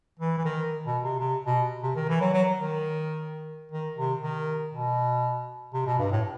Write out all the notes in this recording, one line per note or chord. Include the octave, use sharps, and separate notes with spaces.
E3
E3
D#3
B2
C3
C3
B2
C3
D#3
E3
F#3
F#3
D#3
D#3
C3
D#3
B2
C3
B2
G2
A2